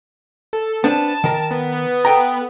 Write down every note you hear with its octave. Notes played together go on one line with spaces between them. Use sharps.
A4
B3 C4 D4 A5
D#3 A#4
B3
A4 G5 A#5